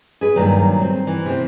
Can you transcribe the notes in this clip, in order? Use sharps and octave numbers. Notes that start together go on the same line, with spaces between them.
G#4 B4
G2 A#2 D#3 F#3
C4
E3
C3 C4